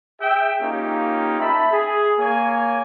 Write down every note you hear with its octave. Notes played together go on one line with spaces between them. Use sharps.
G#4 E5 G5
A#3 C#4 D#4 F4 G4
E5 A5 B5
G#4
A#3 C#5 G#5